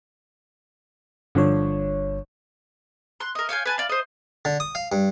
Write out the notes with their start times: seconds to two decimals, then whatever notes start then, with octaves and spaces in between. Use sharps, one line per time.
1.35 G1 G2 D3 F3 D4 C#5
3.20 C6 F#6
3.35 A#4 D#5
3.49 C#5 F5 G5 G#5
3.65 B4 G#5 A5
3.78 D5 F5
3.89 C5 D#5
4.45 D3
4.60 D#6
4.75 F5
4.92 G2